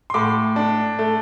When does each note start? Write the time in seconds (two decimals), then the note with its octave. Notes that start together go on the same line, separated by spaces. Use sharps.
0.10 C6
0.14 A2 D6
0.56 D4
0.99 A3